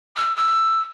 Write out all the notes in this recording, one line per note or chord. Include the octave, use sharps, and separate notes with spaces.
E6
E6